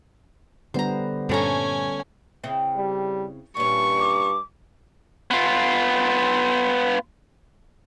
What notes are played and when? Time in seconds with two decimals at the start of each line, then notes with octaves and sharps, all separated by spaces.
0.74 D3 G3 B3 C5 A#5
1.29 G2 A#2 A3 C#4 A4 G#5 A#5
2.43 C#3 C4 E4
2.77 G3
3.57 G2 A#2 C#4 C#6
4.00 D6
5.31 B3 F4